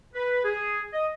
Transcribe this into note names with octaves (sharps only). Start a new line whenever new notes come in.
B4
G#4
D#5